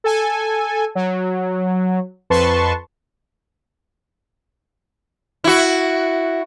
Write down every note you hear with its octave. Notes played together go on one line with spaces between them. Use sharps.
A4 G#5
F#3
F2 B4 A5 C6 C#6
E4 F#4